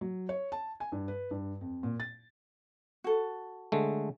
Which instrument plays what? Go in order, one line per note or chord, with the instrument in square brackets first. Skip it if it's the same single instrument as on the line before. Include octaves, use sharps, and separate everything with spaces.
[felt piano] F#3
C#5
A5
G#5
G2
B4
G2
F2
A#2
A6
[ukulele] F#4 A4
[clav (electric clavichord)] D3 G#3 A3